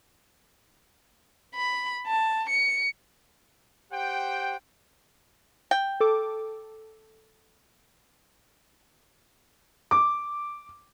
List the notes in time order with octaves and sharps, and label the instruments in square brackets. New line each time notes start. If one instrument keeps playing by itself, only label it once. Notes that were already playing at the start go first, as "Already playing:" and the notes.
[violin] B5
A5
C#7
[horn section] G4 C5 F#5 G5
[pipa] G5
[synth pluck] A4 D6
[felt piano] D6